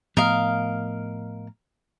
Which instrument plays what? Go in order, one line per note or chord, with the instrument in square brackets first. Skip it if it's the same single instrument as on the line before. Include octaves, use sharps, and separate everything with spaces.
[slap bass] A2 F3 B3 [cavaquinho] A#4 D#5 F5